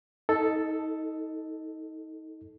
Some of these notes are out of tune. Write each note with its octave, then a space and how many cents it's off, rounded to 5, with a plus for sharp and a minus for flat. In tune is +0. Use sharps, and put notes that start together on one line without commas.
D#4 +35 A4 +0 D#5 +0